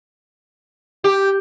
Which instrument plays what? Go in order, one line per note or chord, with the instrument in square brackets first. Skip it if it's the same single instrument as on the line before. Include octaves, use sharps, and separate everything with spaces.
[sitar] G4